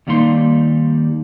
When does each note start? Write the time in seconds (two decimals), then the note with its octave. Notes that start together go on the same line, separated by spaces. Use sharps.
0.07 D#2 G3 A#3 D#4 C6